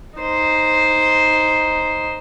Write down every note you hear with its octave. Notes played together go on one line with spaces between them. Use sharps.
D#4 C5